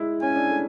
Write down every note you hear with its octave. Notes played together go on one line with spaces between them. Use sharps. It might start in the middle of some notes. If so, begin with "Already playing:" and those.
Already playing: G#3 E4
C#4 G#5
D4
A3